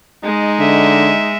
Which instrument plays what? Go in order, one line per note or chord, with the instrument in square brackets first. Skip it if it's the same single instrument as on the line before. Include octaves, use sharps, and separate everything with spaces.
[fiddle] G#3 [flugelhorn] D#4
[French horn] D3 [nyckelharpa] E5